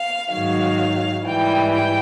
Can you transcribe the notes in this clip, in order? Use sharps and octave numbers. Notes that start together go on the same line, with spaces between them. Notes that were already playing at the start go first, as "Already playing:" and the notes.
Already playing: F5
G#2 D#3 F#3 F5
G#2 E3 G3 G5
G5